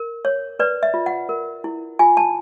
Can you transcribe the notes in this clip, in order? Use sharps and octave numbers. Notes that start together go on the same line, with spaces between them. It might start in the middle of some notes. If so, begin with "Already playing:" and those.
Already playing: A#4
C#5
B4 D5
E5
F4
F#5
A#4
E4
F4 G#5
A5